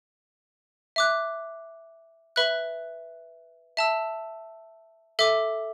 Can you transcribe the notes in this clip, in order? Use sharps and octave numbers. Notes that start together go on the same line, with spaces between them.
E5 D6 F#6
B4 E5 B5 F#6
E5 A5 E6
A4 E5 D6